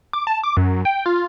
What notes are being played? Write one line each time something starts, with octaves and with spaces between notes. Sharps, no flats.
D6
A5
D6
F#2
G5
F4